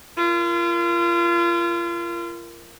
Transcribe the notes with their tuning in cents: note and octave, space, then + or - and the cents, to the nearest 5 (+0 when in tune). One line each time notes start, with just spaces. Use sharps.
F4 -35 A#4 +0